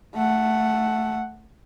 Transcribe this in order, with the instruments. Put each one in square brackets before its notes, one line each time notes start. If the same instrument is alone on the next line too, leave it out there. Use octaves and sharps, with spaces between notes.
[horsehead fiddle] A3 F#5